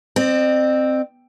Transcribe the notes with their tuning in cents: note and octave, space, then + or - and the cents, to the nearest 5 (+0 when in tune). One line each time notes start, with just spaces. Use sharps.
C4 +0 D#5 -45